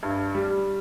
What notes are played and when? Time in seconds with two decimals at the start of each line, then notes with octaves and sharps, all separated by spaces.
0.03 G2
0.35 G3